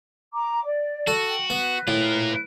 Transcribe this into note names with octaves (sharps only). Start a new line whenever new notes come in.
A#5 D6
D5
F#4 A4
G5
B3 B4
A2 F4 A#4